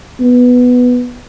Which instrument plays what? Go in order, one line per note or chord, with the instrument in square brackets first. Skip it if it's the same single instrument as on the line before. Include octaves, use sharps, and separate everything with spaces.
[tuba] B3